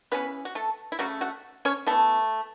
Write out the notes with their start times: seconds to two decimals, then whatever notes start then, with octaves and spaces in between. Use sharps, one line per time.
0.12 C#3 E3 B3 C#4 B4
0.45 F#4
0.55 A3 A4
0.92 E4
0.99 C#3 F#3 A3 C#4 F#4
1.21 F#4 F#5
1.65 C#4 C#5
1.87 E3 A3 B3 A4